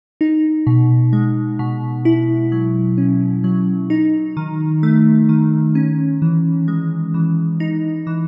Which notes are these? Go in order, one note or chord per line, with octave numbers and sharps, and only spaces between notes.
D#4
B2
G#3
B2
E4
F#3
C#4
F#3
D#4
D#3
A3
D#3
C#4
E3
G#3
E3
D#4
E3